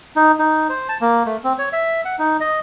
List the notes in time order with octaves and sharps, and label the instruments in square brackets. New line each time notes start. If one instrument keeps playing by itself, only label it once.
[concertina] D#4
D#4
C5
A5
A#3
A3
C4
C#5
E5
F#5
D#4
D#5